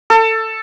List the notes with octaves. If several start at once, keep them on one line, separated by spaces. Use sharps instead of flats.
A4